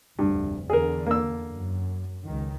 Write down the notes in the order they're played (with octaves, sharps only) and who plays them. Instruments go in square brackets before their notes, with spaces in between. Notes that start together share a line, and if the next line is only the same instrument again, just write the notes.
[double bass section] F1 D2 [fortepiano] G2
[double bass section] E2 D3 [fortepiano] G#4 A#4
[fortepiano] A#3 E6
[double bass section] F#2
C#2 D#3